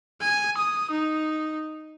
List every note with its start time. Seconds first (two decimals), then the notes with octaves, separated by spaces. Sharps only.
0.21 G#5
0.58 D#6
0.91 D#4